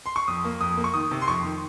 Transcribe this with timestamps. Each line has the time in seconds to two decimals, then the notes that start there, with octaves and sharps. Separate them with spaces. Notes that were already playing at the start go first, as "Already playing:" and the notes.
0.06 C6
0.16 C#6
0.28 F2 D#6
0.45 A#3
0.61 F2 D#6
0.77 A#3
0.84 C#6
0.94 D#3 D#6
1.11 C3
1.22 C6
1.28 F2 C#6
1.44 D#3